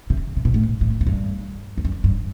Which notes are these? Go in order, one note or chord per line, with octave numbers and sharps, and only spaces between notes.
C3
C3
B2
A2
A2
A2
G2
E2
F#2
G2